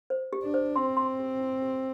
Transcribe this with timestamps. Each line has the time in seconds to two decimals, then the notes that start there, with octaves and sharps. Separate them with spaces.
0.10 C5
0.33 G4
0.43 D4
0.54 C5
0.76 C4 C6
0.97 C6
1.20 G4
1.40 E4
1.62 G4